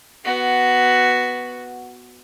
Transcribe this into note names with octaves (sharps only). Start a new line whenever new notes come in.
B3 F#4